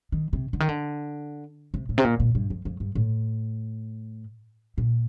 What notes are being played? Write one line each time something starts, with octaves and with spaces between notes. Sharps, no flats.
D#3
C3
D3
D#3
D3
C3
A2
C3
A#2
A#2
G2
F2
F2
G2
A2
A#2